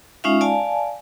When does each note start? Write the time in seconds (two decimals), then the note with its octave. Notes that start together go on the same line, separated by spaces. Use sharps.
0.24 G#3 C#4 D#4 F4 E5 F5
0.41 D5 F5 G#5 A5